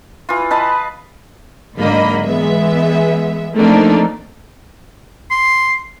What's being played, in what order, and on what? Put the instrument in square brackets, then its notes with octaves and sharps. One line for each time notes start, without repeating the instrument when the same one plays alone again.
[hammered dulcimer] E3 F4
B4 D#5 A5 B5
[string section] G#2 D3 F#3 A#3 D#5 B5
E3 G#3 B3 E5
F3 A3 A#3 C4 D4 D#4
[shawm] C6